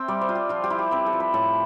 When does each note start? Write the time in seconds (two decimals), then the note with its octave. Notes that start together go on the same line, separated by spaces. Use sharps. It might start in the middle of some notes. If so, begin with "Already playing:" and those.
Already playing: C4 E5 G5 A5
0.08 G3 D5
0.21 C5
0.29 F4
0.35 G4
0.49 F3 F4
0.64 G4
0.70 E4
0.78 G4
0.91 C4 B4
1.06 A4
1.13 F3
1.20 B4
1.34 A2 A4